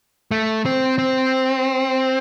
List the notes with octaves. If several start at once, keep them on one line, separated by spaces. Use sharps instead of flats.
A3
C4
C4